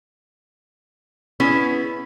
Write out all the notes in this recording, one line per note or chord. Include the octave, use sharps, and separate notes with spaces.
B3 C#4 E4 G#4